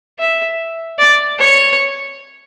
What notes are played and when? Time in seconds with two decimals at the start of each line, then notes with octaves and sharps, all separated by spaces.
0.19 E5
0.99 D5
1.39 C#5